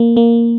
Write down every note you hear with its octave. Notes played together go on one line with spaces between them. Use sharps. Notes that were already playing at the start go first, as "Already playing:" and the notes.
Already playing: A#3
A#3